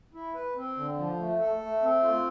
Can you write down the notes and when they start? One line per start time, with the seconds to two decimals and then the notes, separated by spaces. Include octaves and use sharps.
0.14 E4
0.35 B4
0.56 C4
0.77 D3
0.97 F3
1.19 A3
1.39 A4
1.62 A3
1.82 C4
2.03 F4